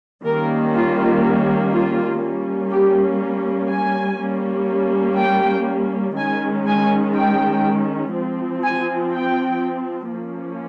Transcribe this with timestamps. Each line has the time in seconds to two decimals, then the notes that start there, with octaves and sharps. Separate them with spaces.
0.25 D#3 G3 A#3 C#4 A#4
0.74 F4
1.73 F4
2.22 G3 A#3 C#4
2.71 G4
3.70 G#5
4.19 G3 A#3 C#4
5.18 G5
6.17 D#3 G#3 C#4 G#5
6.67 G#5
7.16 G5
8.14 F3 C4
8.64 G#5
9.13 G5
10.11 F3 A#3 C#4